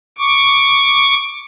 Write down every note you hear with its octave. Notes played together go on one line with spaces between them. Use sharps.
C#6 D6